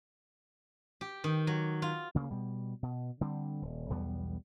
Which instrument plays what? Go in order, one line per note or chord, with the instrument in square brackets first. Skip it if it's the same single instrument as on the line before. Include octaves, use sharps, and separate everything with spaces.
[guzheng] G4
D#3
F#3
F4
[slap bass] D2 C#3 A#3
B2 G3
B2
D3 G3 C4
D#1
B1 E2 G3 B3